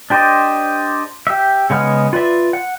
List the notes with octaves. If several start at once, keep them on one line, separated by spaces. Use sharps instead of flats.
D4 G4 C5 D5 D#5
G4 E5
C#3 G#3 B3 F#5 F6
F4 B4 D5 E5
F#5